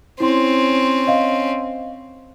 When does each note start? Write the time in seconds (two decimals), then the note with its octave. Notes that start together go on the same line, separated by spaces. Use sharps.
0.20 C4 C#4 E4 C6
1.07 D#5 F5